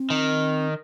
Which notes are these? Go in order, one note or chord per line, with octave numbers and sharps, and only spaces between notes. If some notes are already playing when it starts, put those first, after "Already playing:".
Already playing: C4
D#3